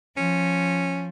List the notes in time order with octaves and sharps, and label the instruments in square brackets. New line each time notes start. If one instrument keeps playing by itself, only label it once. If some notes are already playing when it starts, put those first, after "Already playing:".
[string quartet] F3 [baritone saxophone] C#4